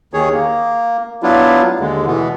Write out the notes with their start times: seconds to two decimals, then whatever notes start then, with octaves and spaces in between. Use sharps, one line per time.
0.13 D#2 D#3 G#4 C#5
0.33 A#3
1.23 F#3 B3 D4 E4 F4
1.80 D#2 D3 G#3
2.06 B2 E3 B3